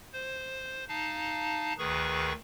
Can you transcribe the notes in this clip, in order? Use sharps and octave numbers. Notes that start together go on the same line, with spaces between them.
C5
D#4 F5 A5
D2 D#3 G#4 B4 C#6